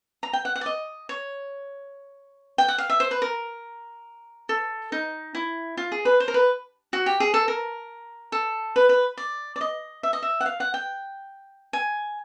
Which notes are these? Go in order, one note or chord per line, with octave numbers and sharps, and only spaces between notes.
A#5
G5
F#5
F#5
D5
D#5
C#5
G5
F#5
F5
E5
C5
B4
A#4
A4
D#4
E4
F4
G#4
B4
C5
A#4
B4
F#4
G4
G#4
A4
A#4
A4
B4
B4
D5
D5
D#5
E5
D#5
E5
F#5
F5
F#5
G5
G#5